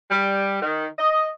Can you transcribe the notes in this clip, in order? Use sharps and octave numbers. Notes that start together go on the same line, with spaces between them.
G3
D#3
D#5